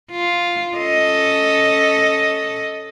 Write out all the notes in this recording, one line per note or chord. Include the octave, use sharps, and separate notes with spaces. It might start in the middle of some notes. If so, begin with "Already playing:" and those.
F4
C#4 A4 D#5